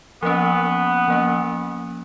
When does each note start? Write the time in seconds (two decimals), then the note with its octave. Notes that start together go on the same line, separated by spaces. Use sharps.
0.22 F3 A#3 B3 C#4
1.08 F3 A#3 C#4